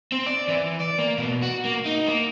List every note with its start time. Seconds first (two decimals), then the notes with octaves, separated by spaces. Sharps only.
0.12 C4
0.26 D5
0.48 E3
0.80 D5
0.99 A#3
1.17 B2
1.42 F#4
1.65 A#3
1.85 D#4
2.08 A#3